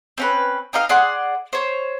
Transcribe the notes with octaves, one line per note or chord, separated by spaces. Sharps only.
C4 C#4 B4
C4 D#4 D#5 F5
G#4 D5 F#5 C6
C5 C#5